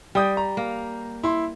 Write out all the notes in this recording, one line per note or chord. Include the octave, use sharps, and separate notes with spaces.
G3 G5 D#6 G6
A#5
A#3
E4 C6